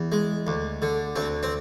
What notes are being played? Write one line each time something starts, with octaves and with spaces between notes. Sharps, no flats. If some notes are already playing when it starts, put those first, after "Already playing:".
Already playing: E2
G#3
D2
D3
D2 C4
C4